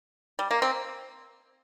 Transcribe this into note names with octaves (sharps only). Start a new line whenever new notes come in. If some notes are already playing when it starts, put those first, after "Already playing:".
G3
A#3
C4